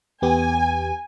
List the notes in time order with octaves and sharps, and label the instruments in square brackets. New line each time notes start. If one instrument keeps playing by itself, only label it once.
[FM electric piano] E2 B3 G4 [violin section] G#5